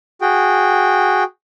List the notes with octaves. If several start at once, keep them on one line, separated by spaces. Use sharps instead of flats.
F#4 G#4 G5